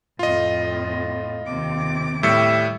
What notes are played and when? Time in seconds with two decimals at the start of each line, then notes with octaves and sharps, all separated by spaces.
0.19 F2 A2 F4 D#5
1.44 D#2 C3 D6
2.23 A2 G3 E5 C#7